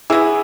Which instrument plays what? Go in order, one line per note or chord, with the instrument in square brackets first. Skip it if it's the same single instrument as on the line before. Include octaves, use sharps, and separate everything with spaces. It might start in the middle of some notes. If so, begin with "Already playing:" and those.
[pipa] E3 G#3 B3 [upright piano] E4 G#4